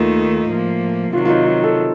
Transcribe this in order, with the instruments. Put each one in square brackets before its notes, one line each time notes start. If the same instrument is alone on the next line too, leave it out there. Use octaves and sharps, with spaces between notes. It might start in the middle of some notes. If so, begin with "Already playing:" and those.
Already playing: [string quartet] D#2 D#3 A3 D#4 [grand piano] F4
[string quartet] A2 F3 A#3
[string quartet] C3 D#3 F#3 [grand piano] F4
[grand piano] F4
D#4
F4
A4